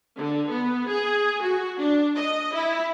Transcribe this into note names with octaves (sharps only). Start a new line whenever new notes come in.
D3
B3
G#4
F#4
D4
D#5
E4